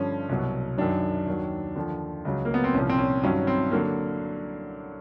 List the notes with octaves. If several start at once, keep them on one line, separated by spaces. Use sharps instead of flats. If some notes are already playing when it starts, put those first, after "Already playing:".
Already playing: G2 D3 F3 C#4
C2 B2 F#3
F#2 D#3 F#3 D4
D#2 D#3 F#3
D#2 D3 F3
C#2 C#3 F#3
A#3
B3
C4
C2 A#2 F3 C#4
C4
C#4
G2 D#3 F#3 C#4
C4
D3 F#3 A#3